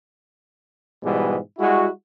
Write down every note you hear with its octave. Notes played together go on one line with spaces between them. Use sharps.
G#2 B2 E3 G3 G#3 B3
G3 G#3 E4 F#4